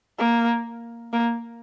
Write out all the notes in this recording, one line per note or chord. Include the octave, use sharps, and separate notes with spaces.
A#3
A#3